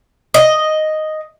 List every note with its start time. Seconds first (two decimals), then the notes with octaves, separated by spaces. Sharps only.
0.34 D#5